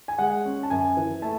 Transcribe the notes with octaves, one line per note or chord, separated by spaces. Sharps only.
G#5
G#3 F#5
C#4
A5
F#2 G#5
E3
A3 A5